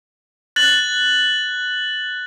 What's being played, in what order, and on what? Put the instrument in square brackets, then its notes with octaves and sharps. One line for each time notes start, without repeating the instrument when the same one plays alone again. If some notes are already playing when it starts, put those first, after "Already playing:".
[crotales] F#6 A6 F#7